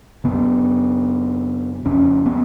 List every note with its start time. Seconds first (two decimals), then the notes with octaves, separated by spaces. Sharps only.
0.24 F#2 C#3 B3
1.85 F2 C#3 C#4
2.26 B3